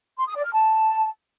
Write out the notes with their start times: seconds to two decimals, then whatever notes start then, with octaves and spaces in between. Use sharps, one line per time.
0.18 C6
0.26 D#6
0.35 D5
0.44 F6
0.52 A5